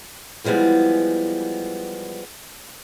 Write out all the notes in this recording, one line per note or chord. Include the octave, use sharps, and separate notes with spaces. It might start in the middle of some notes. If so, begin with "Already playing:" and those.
E3 F3 G3 G#3 B3